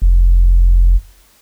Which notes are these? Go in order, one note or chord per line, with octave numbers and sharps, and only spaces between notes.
F1